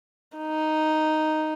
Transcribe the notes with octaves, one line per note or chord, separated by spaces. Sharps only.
D#4